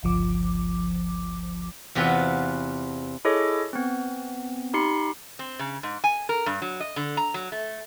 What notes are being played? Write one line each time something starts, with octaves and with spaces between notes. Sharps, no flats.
G1 C#2 F3 D6
E2 C3 B3 F4 F#4 B4
E4 G#4 A4 C#5 D#5 D6
B3 C4
D#4 G4 B5 C6 C7 C#7
C4
C#3
G#2
G#5
A#4
G2
F#3
D#5
D3
A#5
F#3
A3